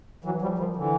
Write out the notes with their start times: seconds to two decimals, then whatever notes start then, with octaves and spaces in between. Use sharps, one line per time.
0.24 E3 F#3
0.42 F3 G3
0.58 D#3 F3
0.76 D3 E3